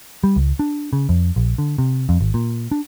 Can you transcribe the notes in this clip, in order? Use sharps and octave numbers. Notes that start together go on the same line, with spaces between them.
G3
C#2
D4
C#3
F2
A#1
D3
C3
F2
G#1
A#2
D4